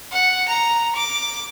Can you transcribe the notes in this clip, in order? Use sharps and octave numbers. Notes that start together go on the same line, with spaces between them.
F#5
A#5
D6